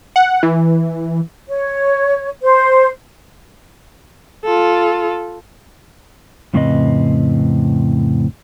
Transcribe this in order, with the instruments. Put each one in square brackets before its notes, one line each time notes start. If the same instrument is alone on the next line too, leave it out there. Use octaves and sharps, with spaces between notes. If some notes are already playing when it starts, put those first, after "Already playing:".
[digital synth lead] F#5
E3
[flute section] C#5
C5
[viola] F4 A4
[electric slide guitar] F2 A2 C#3 C4 B4 D#5